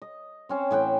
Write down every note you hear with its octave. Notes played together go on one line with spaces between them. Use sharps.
D#5
C4 C#4 C5
A2 E3 F#5 G5